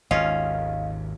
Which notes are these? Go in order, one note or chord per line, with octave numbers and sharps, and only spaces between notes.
G#1 D#2 C#4 F4 D#5 F5